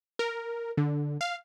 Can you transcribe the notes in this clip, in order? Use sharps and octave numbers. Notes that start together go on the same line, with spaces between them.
A#4
D3
F5